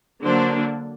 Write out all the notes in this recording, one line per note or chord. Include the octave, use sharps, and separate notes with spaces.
D3 F#3 A#3 D4 C5